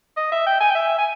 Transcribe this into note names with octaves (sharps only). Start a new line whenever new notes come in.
D#5
E5
G5
G#5
G5
E5
G#5